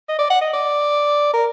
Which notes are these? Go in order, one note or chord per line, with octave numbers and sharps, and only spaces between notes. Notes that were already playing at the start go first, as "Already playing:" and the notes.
D#5
D5
F#5
D#5
D5
A#4